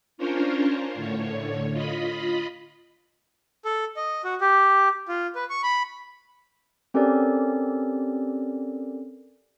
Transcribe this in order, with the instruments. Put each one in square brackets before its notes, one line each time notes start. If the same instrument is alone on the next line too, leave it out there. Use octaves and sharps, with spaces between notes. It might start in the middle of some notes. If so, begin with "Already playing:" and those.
[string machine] C#4 D4 F4 A#4 C5 C#5
A2 D3 C#5
F4 D#5 B5
[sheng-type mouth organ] A4
D#5
F#4
G4
F4
B4
C#6
B5
[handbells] C4 C#4 G4 A4 A#4 D5